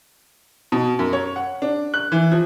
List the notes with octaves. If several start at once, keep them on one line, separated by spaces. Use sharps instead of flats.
B2
F#2
C#5
F#5
D4
F#6
E3
F3